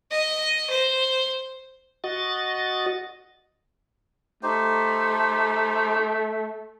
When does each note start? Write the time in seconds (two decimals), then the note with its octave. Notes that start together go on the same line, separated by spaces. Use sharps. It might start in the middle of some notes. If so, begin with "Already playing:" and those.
0.11 D#5
0.70 C5
2.04 F#4 D#5 A6
4.43 A3 D#4 G4 C5